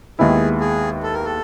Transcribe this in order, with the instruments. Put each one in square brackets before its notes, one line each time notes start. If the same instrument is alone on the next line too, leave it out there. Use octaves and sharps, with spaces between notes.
[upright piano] D#2 D#3 G#3 B3 E4 [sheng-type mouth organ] G#4
[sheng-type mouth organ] G#4
A4
A#4
A4